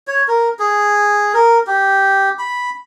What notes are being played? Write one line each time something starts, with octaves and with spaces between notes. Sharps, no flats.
C#5
A#4
G#4
A#4
G4
B5